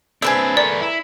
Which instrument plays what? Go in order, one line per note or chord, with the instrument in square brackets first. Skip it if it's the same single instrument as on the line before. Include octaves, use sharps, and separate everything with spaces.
[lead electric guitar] C4 D4 [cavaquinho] G#4 B4 E5
[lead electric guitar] A3 A#4 [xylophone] D5
[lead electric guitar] E4